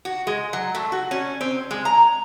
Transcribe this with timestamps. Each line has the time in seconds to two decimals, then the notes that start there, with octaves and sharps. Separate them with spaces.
0.05 F#4
0.27 G#3
0.53 F#3
0.75 A3
0.92 F#4
1.11 C#4
1.41 C4
1.71 G#3
1.85 A#5